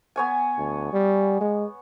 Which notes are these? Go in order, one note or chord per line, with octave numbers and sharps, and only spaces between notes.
B3 C#5 G#5
D2
G3
G#3